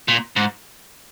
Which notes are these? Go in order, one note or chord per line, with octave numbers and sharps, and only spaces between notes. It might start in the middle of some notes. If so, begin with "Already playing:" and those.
A#2
G#2